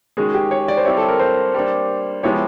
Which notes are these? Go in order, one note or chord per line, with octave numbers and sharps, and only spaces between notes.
D#3 G#3 C#4 F#4 G#4
G4
C#5
D5
C5
G3 C4 E4 G4 C#5
A4
A#4
C5
G3 A#3 D4
F3 G#3 B3 E4 G4 C#5